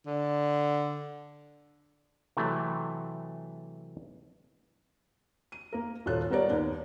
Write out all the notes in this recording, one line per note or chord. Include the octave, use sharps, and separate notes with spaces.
D3
C3 E3 F#3 A3
D#7
A#3 A#4
D#1 F4 A4 C#5 F#6
G3 B3 A#4 C#5 D5
D#2